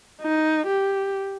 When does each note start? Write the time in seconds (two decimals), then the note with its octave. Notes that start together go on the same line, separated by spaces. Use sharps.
0.22 D#4
0.67 G4